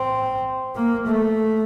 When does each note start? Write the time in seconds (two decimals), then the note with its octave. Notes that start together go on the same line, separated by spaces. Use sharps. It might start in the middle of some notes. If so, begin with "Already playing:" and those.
Already playing: C4
0.76 A#3
1.07 A3